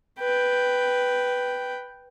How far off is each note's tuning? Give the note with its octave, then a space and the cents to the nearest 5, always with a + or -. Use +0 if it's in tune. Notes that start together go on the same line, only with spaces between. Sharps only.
B4 +0 G5 +0